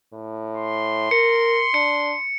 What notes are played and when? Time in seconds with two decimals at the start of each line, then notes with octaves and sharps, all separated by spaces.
0.13 A2
0.57 C6
1.11 A#4 C#7
1.74 D4 C#7